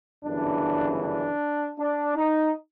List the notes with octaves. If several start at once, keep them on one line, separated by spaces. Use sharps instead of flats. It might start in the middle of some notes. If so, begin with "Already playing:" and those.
G1 F#2 C#3 E3 D4
D4
D4
D#4